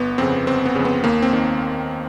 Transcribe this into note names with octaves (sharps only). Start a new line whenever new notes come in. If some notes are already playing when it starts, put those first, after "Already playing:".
Already playing: G1 B3
F2 C#3 C4
G1 C4
B3
F2 C#3
B3
D#2 A#3
C4
D#3